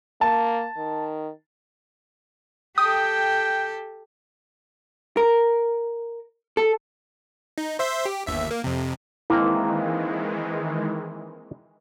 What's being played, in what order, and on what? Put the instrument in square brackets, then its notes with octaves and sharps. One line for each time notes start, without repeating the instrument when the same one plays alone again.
[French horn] A#3 [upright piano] A5
[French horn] D#3
[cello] G4 A4 [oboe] G5 [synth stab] D#6
[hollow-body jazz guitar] A#4
A4
[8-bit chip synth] D#4
C5 E5 C6
G4
G1 D#2 E5
A#3
F2 C3
[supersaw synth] D#3 E3 G#3 [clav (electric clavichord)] A#3 C4 A#5 [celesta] E4